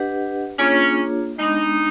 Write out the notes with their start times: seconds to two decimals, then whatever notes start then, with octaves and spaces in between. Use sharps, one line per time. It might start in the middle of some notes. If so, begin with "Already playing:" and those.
Already playing: D4 G4 B4 D#5 F#5
0.58 A#3 C#4 D4 F4 G#4 C#5
1.39 G#3 B3 D4 D#4